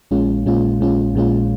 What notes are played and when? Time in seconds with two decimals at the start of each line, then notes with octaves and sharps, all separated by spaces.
0.11 A#1 A#2 G#3 C#4 F4
0.46 A#1 A#2 G#3 C#4 F4
0.80 A#1 A#2 G#3 C#4 F4
1.14 A#1 A#2 G#3 C#4 F4